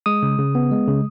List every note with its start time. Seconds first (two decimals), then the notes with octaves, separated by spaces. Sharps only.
0.06 G#3 D#6
0.23 C#3
0.39 C#3
0.55 B3
0.71 G#3
0.88 C#3